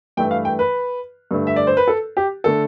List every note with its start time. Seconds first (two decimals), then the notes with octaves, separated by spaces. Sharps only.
0.17 G2 E3 A3 G5
0.31 F5
0.45 G5
0.59 B4
1.31 G2 D3 A3
1.47 E5
1.56 D5
1.67 C5
1.77 B4
1.88 A4
2.17 G4
2.44 D3 A3 A4